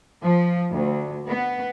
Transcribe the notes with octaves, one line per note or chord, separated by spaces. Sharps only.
F3
D2
B3